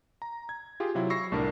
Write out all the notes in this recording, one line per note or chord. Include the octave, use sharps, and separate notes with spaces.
A#5
G#6
F4 G4 G#4
C3 F#3 E4 F4
B5 C#6 E6 A#6 C7
C2 A2 D4 A#4